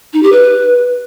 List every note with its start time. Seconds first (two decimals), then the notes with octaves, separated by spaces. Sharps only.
0.13 D#4
0.23 G4
0.32 B4